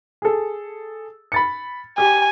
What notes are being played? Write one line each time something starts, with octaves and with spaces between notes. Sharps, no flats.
G#4 A4
B5 A6 C#7
G4 G#5